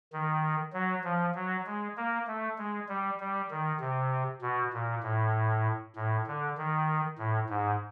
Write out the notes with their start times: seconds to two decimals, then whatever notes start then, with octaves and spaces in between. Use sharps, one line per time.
0.13 D#3
0.73 F#3
1.04 F3
1.35 F#3
1.66 G#3
1.97 A#3
2.27 A3
2.58 G#3
2.89 G3
3.20 G3
3.51 D#3
3.80 C3
4.42 B2
4.73 A#2
5.03 A2
5.96 A2
6.27 D3
6.58 D#3
7.18 A2
7.49 G#2